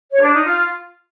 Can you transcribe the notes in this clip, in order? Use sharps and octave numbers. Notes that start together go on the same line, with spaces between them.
C#5
D4
D#4
F4